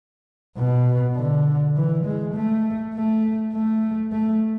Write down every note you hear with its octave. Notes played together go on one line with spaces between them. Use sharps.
B2
D3
E3
G#3
A3
A3
A3
A3